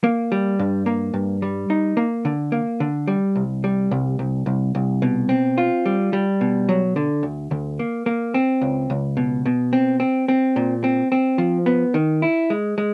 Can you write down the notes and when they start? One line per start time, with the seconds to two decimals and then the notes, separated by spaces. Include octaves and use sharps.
0.04 A#3
0.32 G3
0.59 G2
0.86 A#3
1.14 G2
1.42 G3
1.70 D#4
1.97 A#3
2.25 D3
2.52 A#3
2.80 D3
3.08 G3
3.36 C2
3.64 G3
3.91 C2
4.19 C2
4.46 C2
4.75 C2
5.02 B2
5.29 C4
5.58 F4
5.86 G3
6.13 G3
6.41 B2
6.69 F#3
6.96 D3
7.23 D2
7.51 D2
7.79 A#3
8.06 A#3
8.34 C4
8.61 C#2
8.90 C#2
9.17 B2
9.46 B2
9.73 C4
10.00 C4
10.28 C4
10.56 A#2
10.84 C4
11.12 C4
11.38 F3
11.66 B3
11.94 D#3
12.22 E4
12.50 G#3
12.78 G#3